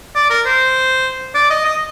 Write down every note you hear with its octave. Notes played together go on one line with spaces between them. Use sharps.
D5
A#4
C5
D5
D#5
D#5